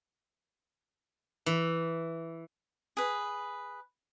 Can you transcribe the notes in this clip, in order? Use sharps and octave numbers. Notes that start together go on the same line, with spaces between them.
E3
G#4 B4